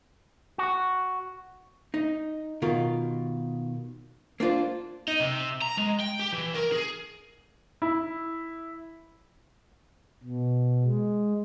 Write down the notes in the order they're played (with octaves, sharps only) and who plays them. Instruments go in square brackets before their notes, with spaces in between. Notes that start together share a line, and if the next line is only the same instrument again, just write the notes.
[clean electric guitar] F#4
[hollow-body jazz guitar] D#4
B2 D#3 F4 A#4
A#3 D4 F4 C5
[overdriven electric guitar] D#4
C3
A#5
G#3
G5
G4
E3
A#4
G#4
[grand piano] E4
[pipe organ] B2
G#3